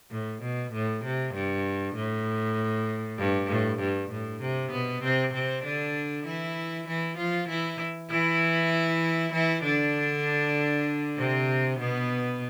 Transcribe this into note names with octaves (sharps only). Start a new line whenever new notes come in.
A2
B2
A2
C3
G2
A2
G2
A2
G2
A2
C3
B2 B3
C3 C4
C3 C4
D3 D4
E3 E4
E3 E4
F3 F4
E3 E4
E3 E4
E3 E4
D3 D4
C3 C4
B2 B3